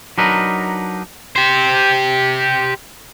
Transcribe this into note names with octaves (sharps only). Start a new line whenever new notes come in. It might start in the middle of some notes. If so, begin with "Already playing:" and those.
F#3 D4 D#4 A#4 B4
G4 C5